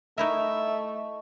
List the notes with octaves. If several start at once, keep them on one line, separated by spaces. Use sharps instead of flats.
A3 D#4 E4 A#4 D#5 E5 C#6